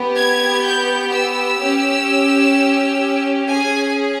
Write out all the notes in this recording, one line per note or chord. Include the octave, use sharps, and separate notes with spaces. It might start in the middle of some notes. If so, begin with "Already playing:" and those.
Already playing: B3 G4
G#6
G6
E6
C#4 G4
C#4 G#4 G#5